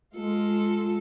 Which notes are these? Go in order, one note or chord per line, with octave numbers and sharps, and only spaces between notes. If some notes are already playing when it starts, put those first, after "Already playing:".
G#3 F4 A4